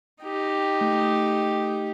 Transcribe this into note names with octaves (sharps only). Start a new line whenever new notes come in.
D#4 G4
A3